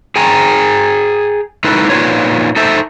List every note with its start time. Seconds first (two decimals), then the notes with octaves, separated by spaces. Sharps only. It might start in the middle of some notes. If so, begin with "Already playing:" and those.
0.16 G#4 G5 G#5 A#5
1.64 G#3 A3 D#4 E4 A4 B4
1.90 A#2 B3 D#4 F4 B4 C#5
2.56 D#4 A4 C5 E5